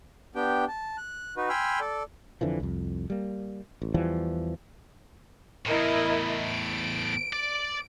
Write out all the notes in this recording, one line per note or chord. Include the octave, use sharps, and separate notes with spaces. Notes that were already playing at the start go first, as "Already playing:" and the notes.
B3 D4 G4 G5
A5
F#6
D#4 F#4 B4
G5 G#5 B5 C6 E6 F6
A4 D5
F2 D3 E3 F3
C2 F2
G3 A#3
A1
E2 E3 F3 G3
E2 A2 E4 A#4 D#5
D7
D5